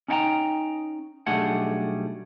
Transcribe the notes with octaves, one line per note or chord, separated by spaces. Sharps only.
C#4 D#4 E4 F#5 G5 A#5
B1 G3 A3 D4 G#4 F#5